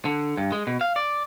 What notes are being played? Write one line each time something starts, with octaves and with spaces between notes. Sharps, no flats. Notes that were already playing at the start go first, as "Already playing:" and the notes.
D3
G2
G#3
B2
F5
D5